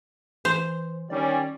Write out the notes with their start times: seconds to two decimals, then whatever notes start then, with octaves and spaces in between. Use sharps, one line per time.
0.45 E3 C5
1.10 D#3 G3 C#4 D5